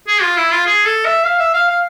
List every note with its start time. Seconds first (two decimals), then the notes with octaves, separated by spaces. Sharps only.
0.08 G#4
0.22 F4
0.37 E4
0.51 F4
0.66 G#4
0.85 A4
1.05 E5
1.24 F5
1.39 E5
1.54 F5
1.69 F5